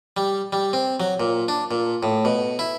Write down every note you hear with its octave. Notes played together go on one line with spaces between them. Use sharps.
G3
G3
C4
F#3
A#2
D4
A#2
A2
B2
E4